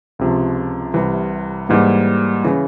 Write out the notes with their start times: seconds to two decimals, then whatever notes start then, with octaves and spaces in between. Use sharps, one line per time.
0.19 C#2 C3 F3
0.94 C2 C3 E3
1.69 G#2 E3 G3 A#3
2.44 C#3 E3